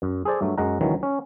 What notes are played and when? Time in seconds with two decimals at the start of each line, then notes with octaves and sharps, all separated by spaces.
0.02 F#2
0.25 G#4 A4 C5 D5
0.41 G2 F#3 A3
0.58 F#2 G#3 F#5 A#5
0.81 C#2 D#3 E3 F#3
1.03 C#4